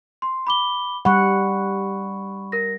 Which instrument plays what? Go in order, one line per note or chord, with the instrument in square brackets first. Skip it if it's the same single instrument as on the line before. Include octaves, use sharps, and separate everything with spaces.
[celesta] C6
B5 D6 G7
[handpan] G3 F#5 [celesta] B5 C#6
[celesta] A#4 A#6